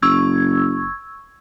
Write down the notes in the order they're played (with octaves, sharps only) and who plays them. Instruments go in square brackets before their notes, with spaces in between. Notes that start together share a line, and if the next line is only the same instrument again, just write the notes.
[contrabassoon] F#1 [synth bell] C#6 E6 G#6